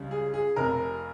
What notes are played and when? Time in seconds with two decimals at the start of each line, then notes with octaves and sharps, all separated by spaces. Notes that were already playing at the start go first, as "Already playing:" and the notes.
Already playing: C#2 C#3 G3
0.11 G#4
0.34 G#4
0.56 F1 F2 C3 A#4